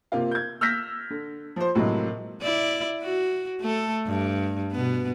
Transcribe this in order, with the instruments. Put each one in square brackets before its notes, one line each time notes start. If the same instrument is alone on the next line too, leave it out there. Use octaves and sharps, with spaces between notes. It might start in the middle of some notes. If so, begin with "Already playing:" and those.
[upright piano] C3 A#3 F4
G6 G#6
E6 F6 G6 A#6 B6
D3
F3 C5
A2 C3 F#3 G#3 A#3
[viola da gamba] E4 D5
F#4
A3 A4
G2
B2 B3